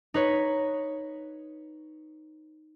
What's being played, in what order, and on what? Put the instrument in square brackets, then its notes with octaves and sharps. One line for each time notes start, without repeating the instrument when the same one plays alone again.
[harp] D#4 B4 C#5